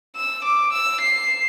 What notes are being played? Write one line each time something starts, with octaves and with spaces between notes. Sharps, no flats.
E6
D6
E6
C7